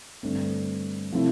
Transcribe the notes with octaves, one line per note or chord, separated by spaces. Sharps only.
G2 D3 A3 C4
C3 F3 A3 C4 E4